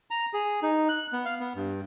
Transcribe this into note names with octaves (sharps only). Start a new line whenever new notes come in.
A#5
G#4
D#4
F#6
B3
F5
B3
G2